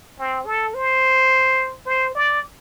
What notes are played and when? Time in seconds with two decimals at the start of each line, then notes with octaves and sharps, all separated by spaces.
0.19 C4
0.46 A4
0.74 C5
1.86 C5
2.15 D5